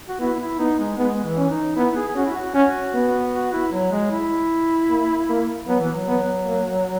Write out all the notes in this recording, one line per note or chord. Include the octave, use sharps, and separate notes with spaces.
F#4
B3 E4
E4
B3 D#4
G#3
G#3 B3
E3
C#4
D#4
B3 E4
G#4
G#4
C#4 F#4
E4
F#4
C#4 F#4
B3
F#4
E4
F#3
G#3
E4
A#3
A#3
F#3 B3
E3
F#3
B3
A#3